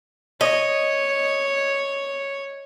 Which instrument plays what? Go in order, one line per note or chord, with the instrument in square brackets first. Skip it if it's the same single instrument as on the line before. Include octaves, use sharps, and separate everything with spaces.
[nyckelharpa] C#5 [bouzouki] D#5